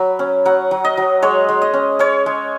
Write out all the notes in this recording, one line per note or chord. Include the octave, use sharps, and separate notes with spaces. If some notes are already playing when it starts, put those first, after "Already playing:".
Already playing: F#3 B5
C#4
F#3 F#5
F#3
D#5
F#3
G#3 C#5
G#3
D#5
C#4
C#4 C#5
G#3